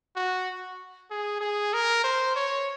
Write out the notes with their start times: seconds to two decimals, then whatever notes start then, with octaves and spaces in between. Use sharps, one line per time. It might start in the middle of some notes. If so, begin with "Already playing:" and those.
0.16 F#4
1.10 G#4
1.41 G#4
1.73 A#4
2.04 C5
2.36 C#5